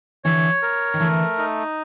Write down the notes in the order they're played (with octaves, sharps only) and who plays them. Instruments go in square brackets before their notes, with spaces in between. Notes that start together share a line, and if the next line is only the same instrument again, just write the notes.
[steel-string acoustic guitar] D3 E3 [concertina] C#5
[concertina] A#4
[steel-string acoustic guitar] D#3
[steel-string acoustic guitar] D3 E3 [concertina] A3
[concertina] D#4